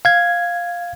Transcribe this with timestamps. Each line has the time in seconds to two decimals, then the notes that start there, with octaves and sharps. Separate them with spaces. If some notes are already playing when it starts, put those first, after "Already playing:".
0.05 F5 G#6